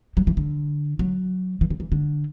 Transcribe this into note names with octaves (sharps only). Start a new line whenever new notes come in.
F#3
E3
D3
F#3
E3
D3
E3
D3